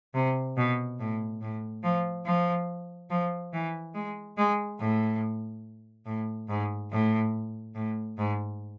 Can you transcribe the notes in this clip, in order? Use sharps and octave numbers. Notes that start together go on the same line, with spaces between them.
C3
B2
A2
A2
F3
F3
F3
E3
G#3
G#3
A2
A2
G#2
A2
A2
G#2